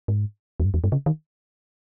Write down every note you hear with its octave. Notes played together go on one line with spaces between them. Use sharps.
G#2
E2
G2
E2
G2
C#3
D#3